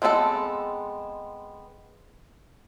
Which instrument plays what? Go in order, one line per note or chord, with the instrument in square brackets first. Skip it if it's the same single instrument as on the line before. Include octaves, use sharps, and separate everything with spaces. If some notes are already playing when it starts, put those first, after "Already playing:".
[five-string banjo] G#3 B3 C4 E4 A4